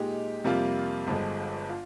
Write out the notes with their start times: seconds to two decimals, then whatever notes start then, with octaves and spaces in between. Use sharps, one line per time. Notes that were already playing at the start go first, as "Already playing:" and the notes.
Already playing: A#2 G#3 D#4 G4
0.44 F2 C3 G3 A#3 F4
1.07 G1 G2 D3 F3 G#3
1.69 F4